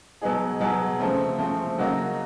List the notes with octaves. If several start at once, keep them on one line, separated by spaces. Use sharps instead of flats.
B2 F#3 B3 D#4 G#4
B2 F#3 B3 D#4 G#4
C#3 F3 A3 C4
C#3 F3 A3 C4
C#3 F#3 A#3 D#4 F#4